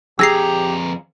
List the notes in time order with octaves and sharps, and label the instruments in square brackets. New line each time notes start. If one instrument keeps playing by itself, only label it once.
[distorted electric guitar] F2 A#5 [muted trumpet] G4 [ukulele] G#4 [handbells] E6 A#6 C7